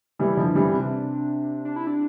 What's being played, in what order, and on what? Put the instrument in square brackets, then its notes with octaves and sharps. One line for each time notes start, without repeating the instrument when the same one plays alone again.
[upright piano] E3 G3 [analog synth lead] E4
[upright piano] D3 F3
[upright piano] E3 G3 [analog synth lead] D4
[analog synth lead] C4
[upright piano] C3 [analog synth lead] D4
[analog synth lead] D4
E4
D4